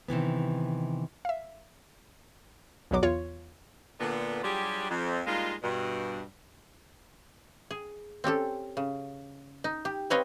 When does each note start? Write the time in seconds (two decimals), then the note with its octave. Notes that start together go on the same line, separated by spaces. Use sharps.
0.08 C3 D#3 E3 B3
1.25 E5 F5
2.91 B1 E2 B2 F#3 D6
3.03 E2 F4 C#5
3.99 A#2 D3 B3
4.43 F#3 G3 D4 F4 G4 G#4
4.90 F2
5.27 G3 G#3 A#3 D#4 F4
5.63 G2 B2
7.71 G#4
8.24 C4 C#4 G4 A4
8.77 C#3
9.64 D#4
9.85 G4
10.10 C4 B4 C#5 D#5 F5